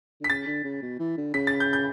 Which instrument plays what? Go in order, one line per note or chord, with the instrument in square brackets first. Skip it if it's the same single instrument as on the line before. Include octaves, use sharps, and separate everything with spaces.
[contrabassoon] D3
[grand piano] B6
[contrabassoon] C#3 [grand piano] A6
[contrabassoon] D3
C#3
B2
E3
D3
[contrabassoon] C#3 [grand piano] B6
[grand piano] A6
G6
G6